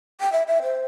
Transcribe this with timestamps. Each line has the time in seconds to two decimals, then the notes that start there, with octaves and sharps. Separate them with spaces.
0.20 G5
0.32 E5
0.47 E5
0.63 C5